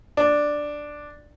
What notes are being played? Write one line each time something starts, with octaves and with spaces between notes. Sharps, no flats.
D4